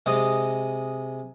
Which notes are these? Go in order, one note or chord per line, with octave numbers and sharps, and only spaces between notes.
C3 G#3 D#5